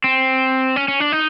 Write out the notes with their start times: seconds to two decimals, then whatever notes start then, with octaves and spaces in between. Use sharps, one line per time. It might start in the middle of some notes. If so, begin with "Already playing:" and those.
0.04 C4
0.76 C#4
0.88 C#4
1.00 D4
1.12 D#4